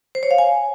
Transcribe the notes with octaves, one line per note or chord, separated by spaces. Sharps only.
C5
C#5
F5
G#5